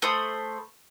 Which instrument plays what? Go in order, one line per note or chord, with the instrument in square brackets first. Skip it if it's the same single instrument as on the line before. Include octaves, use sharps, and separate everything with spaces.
[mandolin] A3 C5 B5 D#6